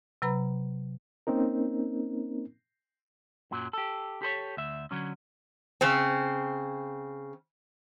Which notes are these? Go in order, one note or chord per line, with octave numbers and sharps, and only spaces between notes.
C3 F#3 B4 A#5 B5
A#3 C4 C#4 D#4 A#4
F#2 A#2 F#3
G4 A4
G4 A4 C5 C#5
D2 E5
D3 F#3 C#4
C#3 C4